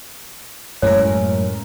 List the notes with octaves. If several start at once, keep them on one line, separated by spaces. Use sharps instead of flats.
F#2 A2 G#3 A3 C#4 A#4 C#5